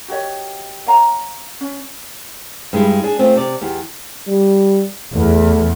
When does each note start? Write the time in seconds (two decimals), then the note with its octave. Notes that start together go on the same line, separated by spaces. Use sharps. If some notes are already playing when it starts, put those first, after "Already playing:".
0.08 F#4 G4 C#5 D#5
0.86 C#5 F5 A#5
1.61 C#4
2.73 G2 G#3 E4
3.04 D4 G#4 G#5
3.19 A3 C4 C#4 F4
3.36 C3 D5
3.61 E2 G4
4.28 G3
5.15 E2 A3